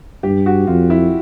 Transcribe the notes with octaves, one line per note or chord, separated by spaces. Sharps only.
G2 G4
F#4
F2 F4
E4